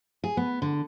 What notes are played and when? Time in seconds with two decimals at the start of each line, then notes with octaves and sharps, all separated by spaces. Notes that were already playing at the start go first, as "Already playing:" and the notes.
0.24 G#4
0.37 B3
0.62 D3